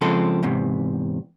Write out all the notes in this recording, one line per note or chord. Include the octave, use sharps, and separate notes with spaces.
C#3 F3 G#3 C4 A4
E2 G#2 C3